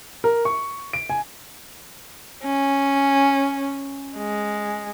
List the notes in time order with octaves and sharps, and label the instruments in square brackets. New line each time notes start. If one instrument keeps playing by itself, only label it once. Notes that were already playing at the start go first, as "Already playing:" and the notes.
[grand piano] A#4
C#6
D7
G#5
[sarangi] C#4
G#3